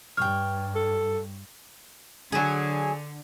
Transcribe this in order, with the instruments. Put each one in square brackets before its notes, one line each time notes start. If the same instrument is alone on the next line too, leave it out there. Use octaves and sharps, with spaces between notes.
[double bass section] G2 [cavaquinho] C#5 G5 [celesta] F6
[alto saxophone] A4
[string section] D3 [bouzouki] F#3 G#4